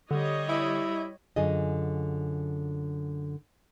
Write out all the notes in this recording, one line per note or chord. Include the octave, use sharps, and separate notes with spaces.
D3 G3 C#5 D#5
E4
F#2 D3 F4 G#4 D#5